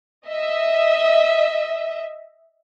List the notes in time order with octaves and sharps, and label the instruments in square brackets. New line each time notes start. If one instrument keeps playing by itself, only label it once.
[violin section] D#5 E5